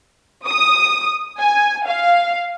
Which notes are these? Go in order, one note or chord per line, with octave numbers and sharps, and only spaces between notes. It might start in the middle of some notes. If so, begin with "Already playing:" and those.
D#6
G#5
F5